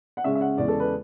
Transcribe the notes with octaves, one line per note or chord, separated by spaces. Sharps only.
F#5
C#3 G#3 C#4 E5
E5
F#5
E2 C#3 G#3 C#4 D5
A4
B4